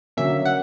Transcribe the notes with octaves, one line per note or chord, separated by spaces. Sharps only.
D3 F#3 A#3 C#4 E5
F#5